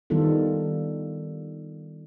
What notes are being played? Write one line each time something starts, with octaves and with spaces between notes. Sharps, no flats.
D#3 G3 B3 F4 A4